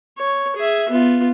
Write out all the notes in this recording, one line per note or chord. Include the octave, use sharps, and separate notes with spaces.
C#5
G#4 E5
B3 F4